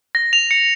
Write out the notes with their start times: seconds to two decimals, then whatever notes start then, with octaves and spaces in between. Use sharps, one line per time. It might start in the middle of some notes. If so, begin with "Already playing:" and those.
0.15 A#6
0.33 F7
0.51 C#7